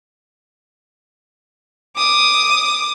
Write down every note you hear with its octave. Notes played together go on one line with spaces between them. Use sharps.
D6 D#6